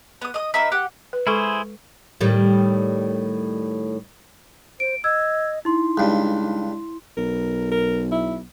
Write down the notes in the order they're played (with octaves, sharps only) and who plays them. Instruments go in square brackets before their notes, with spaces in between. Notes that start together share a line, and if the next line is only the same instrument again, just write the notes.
[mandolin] B3 D#6
D#5 D#6
A#3 D#4 E5 B5
G4 F#5
[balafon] B4
[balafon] G#3 A4 C#6 [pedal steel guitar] E4 G#4 C5
[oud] A2 D#3 G3
[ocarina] C5 [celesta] D7
[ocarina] D#5 [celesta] E6 G#6
[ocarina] D#4 [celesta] E4 C6
[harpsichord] C#2 G2
[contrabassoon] B1 [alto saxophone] A#4
[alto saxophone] A#4
E4